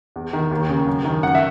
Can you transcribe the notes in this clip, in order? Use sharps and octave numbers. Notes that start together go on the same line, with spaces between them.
E2
D#3
D#2
C#3
F#2
D#3
F#2 F#5
E5